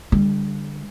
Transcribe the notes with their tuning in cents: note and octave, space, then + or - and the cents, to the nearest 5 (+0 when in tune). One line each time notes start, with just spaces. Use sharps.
D3 +0 G3 +25